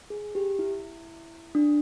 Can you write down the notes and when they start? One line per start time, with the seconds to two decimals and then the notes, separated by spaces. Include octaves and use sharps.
0.10 G#4
0.35 G4
0.59 E4
1.55 D4